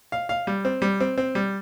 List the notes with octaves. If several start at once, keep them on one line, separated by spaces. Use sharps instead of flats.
F5
F5
G3
C4
G3
C4
C4
G3